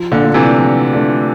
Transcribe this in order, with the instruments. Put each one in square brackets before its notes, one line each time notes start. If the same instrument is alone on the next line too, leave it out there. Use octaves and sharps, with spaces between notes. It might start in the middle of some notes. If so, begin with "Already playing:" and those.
Already playing: [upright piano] F3
[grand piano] A#2 D3
[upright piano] A3 D4 F4
[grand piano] C3 E3
[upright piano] F3
A3 D4 F4